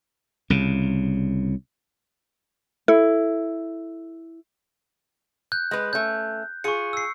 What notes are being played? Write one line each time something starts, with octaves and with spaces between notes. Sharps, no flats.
C2 C#3
E4 A4
F#6 G6
G#3 B4
A3 C#4 G6
F4 G#4 C#6 C#7
E6 C7